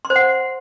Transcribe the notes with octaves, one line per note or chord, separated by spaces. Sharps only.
C6
C5
F#5